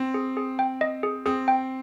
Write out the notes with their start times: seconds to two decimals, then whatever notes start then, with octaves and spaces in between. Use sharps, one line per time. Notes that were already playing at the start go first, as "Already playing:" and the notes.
Already playing: C4
0.14 G#4
0.37 G#4
0.59 G5
0.81 D#5
1.03 G#4
1.26 C4 G#4
1.48 G5